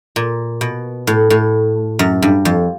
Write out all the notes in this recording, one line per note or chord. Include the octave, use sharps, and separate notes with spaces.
A#2
B2
A2
A2
F#2
G2
F2